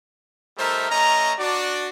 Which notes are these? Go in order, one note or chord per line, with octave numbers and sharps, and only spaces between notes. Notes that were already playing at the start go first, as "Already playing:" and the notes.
G3 A3 D#4 A#4 C5 E5
A3 C#4 D#5 A#5
D4 F#4 D5